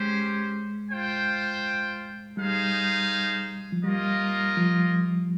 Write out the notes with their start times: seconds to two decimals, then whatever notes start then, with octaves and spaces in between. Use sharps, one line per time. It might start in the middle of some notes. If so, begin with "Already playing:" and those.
Already playing: G#3 C#4 G4 C5
0.91 F4 C5 G5
2.37 G3 D#4 G#4 C5 F5
3.72 F3
3.84 G3 A#3 F4 A#4 D#5
4.57 F3